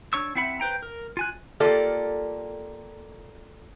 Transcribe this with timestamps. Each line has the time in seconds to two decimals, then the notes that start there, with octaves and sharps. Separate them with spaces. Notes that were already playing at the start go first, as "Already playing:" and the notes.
0.13 D4 C#5 C#6 E6
0.35 C4 E4 E5 F#5 B5
0.60 B4 C5 G5 A#5
0.83 A#4
1.17 F4 G#5 F#6
1.60 A#3 F4 G4 A4 D5